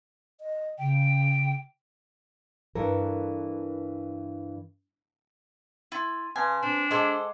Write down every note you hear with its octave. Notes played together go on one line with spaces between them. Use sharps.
D#5
C#3 G5
G2 E3 A4 A#4
E4 C6 A6 D#7
C#3 B4 G#5 A5 C6
C4 D4
G#3 G#4 A4 C5 F#5 D6